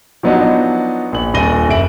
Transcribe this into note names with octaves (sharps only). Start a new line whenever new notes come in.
F3 F#3 B3 D4 D#4 F#4
A#1 F#7
D#1 D4 A#6 D#7 G7
F#1 F2 E5 D7 F#7